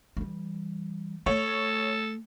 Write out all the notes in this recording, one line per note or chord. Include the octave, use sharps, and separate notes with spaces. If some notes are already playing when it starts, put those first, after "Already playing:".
E3 G3
A3 A4 C#5